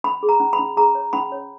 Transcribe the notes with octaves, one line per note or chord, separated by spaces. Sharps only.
C#4 B5
G#4
A#5
C#4
B5
C#4
G#4 A#5
C#5
C#4 B5
C#5